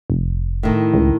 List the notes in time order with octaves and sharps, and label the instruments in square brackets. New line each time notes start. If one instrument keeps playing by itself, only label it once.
[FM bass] F1
[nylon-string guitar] A2 D#3
[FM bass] C#2